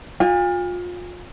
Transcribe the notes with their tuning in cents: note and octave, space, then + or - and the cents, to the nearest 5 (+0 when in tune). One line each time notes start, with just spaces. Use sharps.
F4 +30 G#5 -40